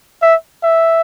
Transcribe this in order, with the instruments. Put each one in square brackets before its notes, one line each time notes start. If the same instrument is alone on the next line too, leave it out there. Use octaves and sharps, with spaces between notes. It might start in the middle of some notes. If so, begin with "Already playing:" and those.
[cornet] E5
E5